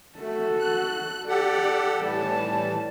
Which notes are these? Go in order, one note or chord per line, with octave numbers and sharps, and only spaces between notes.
A3 F#4 A4
F#6
G4 A4 D5 F#5
A2 E3 G3 A5